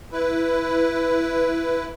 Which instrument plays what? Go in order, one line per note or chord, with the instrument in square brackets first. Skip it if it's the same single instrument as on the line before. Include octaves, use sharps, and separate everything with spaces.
[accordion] E4 B4